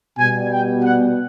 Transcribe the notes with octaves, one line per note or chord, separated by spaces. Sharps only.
B2 G3 G#5
G5
F#5